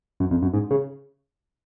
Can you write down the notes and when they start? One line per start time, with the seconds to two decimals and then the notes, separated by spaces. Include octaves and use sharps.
0.20 F#2
0.31 F2
0.42 F#2
0.54 G#2
0.71 C#3